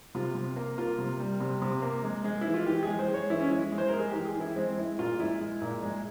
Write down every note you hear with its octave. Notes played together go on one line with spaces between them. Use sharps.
C3 F4
C3
A#3
A#3 F4
C3
G3
C3
C3
A#3
G#3
G#3
E3 E4
F4
E3 G4
G#3 G#4
C5
G#3
C#5
E3 E4
C#4
G#3 E4
G#3
C5
A#4
G#3
G#4
E3 G4
G#4
E3
E4
G#3 C4
G#3 E4
A#2 F4
G#3 E4
G#3
A#2
G#3